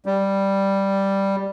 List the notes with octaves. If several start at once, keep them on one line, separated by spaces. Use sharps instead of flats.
G3